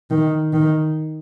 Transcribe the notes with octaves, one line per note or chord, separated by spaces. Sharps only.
D#3
D#3